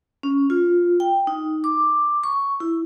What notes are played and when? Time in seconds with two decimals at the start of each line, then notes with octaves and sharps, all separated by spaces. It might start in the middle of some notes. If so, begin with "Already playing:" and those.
0.23 C#4
0.50 F4
1.00 G5
1.27 D#4
1.64 D6
2.24 C#6
2.60 E4